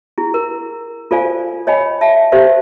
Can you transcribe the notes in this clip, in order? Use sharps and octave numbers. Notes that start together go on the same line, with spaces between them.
E4 G#4
A#4
F4 A4 C5 D5 F5 G#5
C#5 D#5 G5 G#5 B5
E5 A5
G4 A4 C5 D5 E5 F5